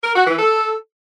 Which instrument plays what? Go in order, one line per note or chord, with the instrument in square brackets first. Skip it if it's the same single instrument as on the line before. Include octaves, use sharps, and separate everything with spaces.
[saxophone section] A#4
F#4
E3
A4